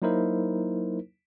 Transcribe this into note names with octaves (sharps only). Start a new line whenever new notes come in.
F#3 A#3 D#4 E4 A#4 C5